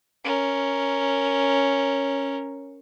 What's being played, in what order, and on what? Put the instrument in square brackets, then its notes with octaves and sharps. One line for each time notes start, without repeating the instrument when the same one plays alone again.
[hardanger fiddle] C#4 A#4